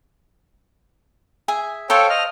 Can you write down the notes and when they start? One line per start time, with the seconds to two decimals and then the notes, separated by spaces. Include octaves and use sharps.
1.48 G#4 E5 G#5
1.90 A4 C5 C#5 F5 G5 A5
2.10 D#5 F6